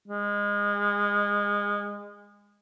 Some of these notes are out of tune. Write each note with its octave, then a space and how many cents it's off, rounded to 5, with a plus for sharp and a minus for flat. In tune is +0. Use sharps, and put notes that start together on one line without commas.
G#3 -25